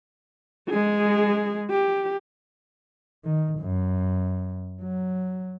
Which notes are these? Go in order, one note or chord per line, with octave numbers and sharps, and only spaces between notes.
G#3 G#4
G4
D#3
F#2
F#3